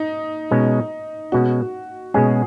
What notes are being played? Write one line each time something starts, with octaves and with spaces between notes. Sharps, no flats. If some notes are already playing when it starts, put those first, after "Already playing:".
Already playing: D#4
B2 G#3 C#4
B2 G#3 C#4 F#4
B2 G#3 C#4 G#4